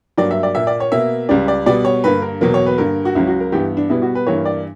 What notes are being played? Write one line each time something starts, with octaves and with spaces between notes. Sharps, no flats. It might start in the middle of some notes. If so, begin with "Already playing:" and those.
G2 F#3 A#3 D5
E5
D5
A#2 A#3 E5
D5
C#5
B2 A#3 E5
C#2 C#3 G3 D5
D5
B2 G3 B3 D5
C#5
G2 D3 A#3 B4
A#4
E2 B2 F#3 A#3 A#4
C#5
B4
G2 D3 A#3 A#4
F#4
C#2 C#3 F#3 E4
F#4
A#4
G2 E3 B3 G4
D4
B2 G3 B3 E4
F#4
B4
G2 E3 A#3 C#5
D5